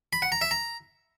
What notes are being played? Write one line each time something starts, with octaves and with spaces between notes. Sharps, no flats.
B5
F#5
A#5
E5
A#5